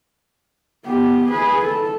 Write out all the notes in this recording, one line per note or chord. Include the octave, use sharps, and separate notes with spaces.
B3 G4
G#4 B4
A4